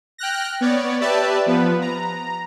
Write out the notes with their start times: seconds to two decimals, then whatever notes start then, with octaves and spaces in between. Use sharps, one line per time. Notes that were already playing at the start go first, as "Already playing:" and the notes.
0.18 G5 F6 F#6 A#6
0.61 B3 C#5 D5
1.01 G4 B4 D5 E5 A5
1.46 F3 B3 B4
1.81 A#5